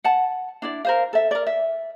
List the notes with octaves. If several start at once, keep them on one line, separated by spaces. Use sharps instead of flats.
F#5 A5
D4 E4 D5
A#4 C5 F5
A4 E5
A#4 D5
E5